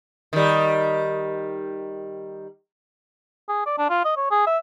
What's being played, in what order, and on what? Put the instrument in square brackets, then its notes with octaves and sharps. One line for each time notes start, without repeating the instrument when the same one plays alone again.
[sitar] D#3 G3
[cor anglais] G#4
D5
D4
F4
D#5
C#5
G#4
E5